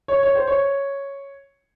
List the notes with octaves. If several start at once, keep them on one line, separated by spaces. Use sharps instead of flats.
C#5
C#5
C5
C#5